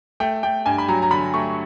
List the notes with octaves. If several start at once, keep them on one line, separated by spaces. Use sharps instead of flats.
A3 G5
A3 G5
G2 G#5
B5
F#3 A#5
A#5
D3 B5
A3 C#6